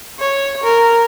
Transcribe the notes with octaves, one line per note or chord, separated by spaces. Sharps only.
C#5
A#4